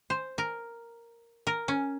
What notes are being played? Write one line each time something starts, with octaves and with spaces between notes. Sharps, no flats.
C5
A#4
A#4
C#4